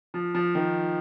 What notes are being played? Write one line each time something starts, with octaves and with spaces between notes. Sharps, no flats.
F3
F3
D#3